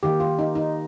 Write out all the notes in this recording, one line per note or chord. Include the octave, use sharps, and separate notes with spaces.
D#3 A#3 G4
F4
D#4
D#4